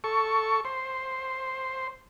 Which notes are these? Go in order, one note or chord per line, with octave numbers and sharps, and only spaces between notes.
A4 C#6
C5